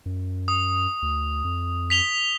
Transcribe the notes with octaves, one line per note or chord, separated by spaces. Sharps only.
F#2
D#6
D2
F2
B6 F7 G7